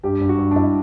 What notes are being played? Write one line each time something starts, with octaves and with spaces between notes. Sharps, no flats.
G2 G4
G2
F#4
G2
D4
G2 E4